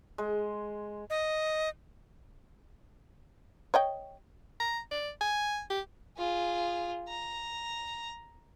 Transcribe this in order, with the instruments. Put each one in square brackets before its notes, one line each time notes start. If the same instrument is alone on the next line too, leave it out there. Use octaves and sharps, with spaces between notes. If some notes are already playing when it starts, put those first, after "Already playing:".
[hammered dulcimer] G#3
[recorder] D#5
[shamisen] C#5 D#5 G5
[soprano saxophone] A#5
D5
G#5
G4
[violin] F4 G#4
A#5